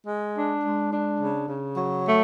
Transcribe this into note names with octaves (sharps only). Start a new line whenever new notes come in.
G#3
D4
G#3
D4
C#3
C#3
F#3
A3